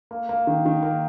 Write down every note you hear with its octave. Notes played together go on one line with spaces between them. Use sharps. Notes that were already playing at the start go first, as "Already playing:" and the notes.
A#3
A#3
D#3
D#3
A#3